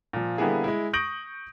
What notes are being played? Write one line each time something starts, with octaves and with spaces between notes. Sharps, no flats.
A#2 F3
D3 G3 A#3 B3 E4 G#4
G#3 E4
C#6 D#6 G6 A#6 D7 F#7